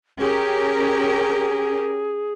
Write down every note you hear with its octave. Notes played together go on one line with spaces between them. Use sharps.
C#4 G4 G#4 A#4